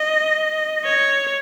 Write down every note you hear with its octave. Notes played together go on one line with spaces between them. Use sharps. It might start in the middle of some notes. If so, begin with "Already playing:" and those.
Already playing: D#5
C#5